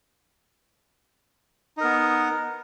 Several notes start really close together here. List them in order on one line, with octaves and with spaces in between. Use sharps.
D#4 A#4 B3